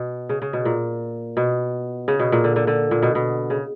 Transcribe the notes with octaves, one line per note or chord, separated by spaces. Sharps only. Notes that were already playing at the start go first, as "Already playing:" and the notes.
Already playing: B2
C#3
C#3
B2
A#2
B2
C#3
B2
A#2
D3
D3
D3
A#2
B2
B2
C#3